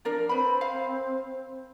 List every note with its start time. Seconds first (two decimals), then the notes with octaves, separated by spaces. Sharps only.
0.05 F3 D4 A#4 D5
0.29 C4 B4 B5
0.61 F5